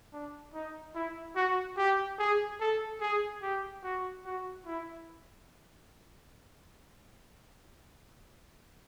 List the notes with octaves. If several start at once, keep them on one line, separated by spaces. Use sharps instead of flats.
D4
D#4
E4
F#4
G4
G#4
A4
G#4
G4
F#4
F#4
E4